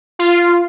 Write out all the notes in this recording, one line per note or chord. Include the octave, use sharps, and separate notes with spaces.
F4